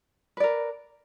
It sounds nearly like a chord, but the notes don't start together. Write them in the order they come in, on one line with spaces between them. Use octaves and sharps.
B4 D5 A#4